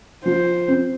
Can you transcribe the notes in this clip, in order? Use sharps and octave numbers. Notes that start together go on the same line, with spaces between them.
F3 C5
C4